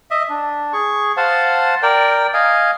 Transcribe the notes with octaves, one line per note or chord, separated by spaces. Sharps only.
D#5 E5
D4
G#4 C#6
C5 F5 F#5 A5
A#4 D5 G5
D#5 F5 G#5